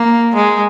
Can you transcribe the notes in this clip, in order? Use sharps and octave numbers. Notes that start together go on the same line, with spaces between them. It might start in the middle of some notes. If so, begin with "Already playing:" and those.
Already playing: A#3
G#3